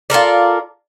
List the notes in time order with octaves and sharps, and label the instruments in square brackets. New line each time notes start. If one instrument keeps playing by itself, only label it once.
[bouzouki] F4 A4 A#4 D5